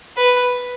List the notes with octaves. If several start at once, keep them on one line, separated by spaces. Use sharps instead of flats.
B4